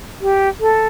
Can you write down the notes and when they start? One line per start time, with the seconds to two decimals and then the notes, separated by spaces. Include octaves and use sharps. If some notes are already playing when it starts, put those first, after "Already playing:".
0.21 G4
0.60 A4